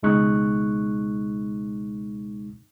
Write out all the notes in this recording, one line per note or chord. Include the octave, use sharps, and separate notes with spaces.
C#2 B2 G#3 D#4 C#6 F#6